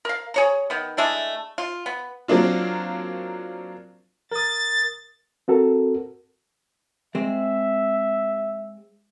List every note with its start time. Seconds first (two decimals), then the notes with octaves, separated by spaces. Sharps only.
0.05 A#4 F5
0.34 G#4 C#5 A#5
0.70 D#3 B3
0.97 G#3 A3 D4 E4
1.58 F4
1.86 B3
2.28 F#3 A#3 C4 D4 F4
4.32 A#4 D#6 A6
5.48 C4 F#4 A4 A#4
7.15 G#3 C4 E5